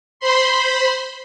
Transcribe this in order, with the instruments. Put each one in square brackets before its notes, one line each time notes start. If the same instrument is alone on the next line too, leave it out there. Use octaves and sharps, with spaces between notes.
[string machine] C5 B5 C6